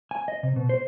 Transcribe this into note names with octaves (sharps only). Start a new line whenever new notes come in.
G#5
D#5
C3
B2
C5